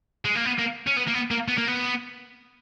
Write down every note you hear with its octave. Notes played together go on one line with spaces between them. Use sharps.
G#3
A#3
B3
A#3
C#4
B3
A#3
B3
A#3
B3
A#3
B3